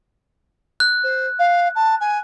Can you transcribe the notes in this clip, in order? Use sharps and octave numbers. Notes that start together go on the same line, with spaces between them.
F#6
C5
F5
A5
G#5